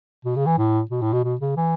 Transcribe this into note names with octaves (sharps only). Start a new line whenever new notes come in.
B2
C#3
E3
A2
B2
A2
B2
B2
C#3
E3